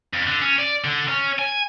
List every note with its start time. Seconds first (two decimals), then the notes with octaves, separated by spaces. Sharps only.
0.14 F2
0.27 D3
0.41 C#4
0.59 D5
0.84 D3
1.09 C#4
1.39 G#5